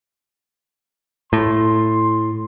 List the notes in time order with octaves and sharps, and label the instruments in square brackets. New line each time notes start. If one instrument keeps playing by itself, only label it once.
[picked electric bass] A2 [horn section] C6